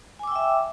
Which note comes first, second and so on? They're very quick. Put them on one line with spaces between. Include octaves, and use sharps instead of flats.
G#5 D6 E6 G5 E5